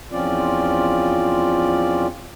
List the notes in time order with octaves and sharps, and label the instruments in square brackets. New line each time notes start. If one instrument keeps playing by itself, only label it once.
[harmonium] E2 F3 C4 C#4 F4 D5